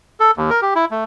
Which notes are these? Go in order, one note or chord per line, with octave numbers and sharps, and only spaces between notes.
A4
D#2
A#4
G4
E4
A3